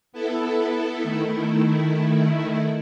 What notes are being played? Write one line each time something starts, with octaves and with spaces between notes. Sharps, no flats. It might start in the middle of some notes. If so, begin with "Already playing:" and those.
B3 E4 A4
D#3 A3 E4